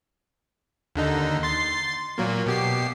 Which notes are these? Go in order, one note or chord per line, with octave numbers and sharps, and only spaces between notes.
D#2 D3 D#4
C6 A6 C7
A#2 F#3 A#3
B2 G4 C7